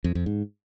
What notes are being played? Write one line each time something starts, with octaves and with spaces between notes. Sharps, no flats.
F2
F2
G#2